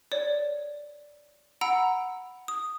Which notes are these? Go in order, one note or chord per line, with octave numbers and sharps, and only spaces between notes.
C#5 D5
F#5 A#5 B5 E6 D7
D#6